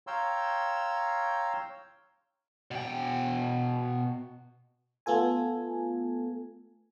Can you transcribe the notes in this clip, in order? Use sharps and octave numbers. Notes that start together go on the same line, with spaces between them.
C#5 F5 G5 A#5 C6 E6
B2 G5
A3 B3 F4 A4 G#5